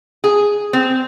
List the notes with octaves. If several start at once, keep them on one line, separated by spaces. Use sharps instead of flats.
G#4
C4